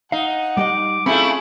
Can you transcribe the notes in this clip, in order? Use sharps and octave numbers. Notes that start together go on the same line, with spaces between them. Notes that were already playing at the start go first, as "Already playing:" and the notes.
D#4 F5 F#5
G3 G4 D#5 D6
A3 C4 C#4 E4 F4 G#4 E5 B5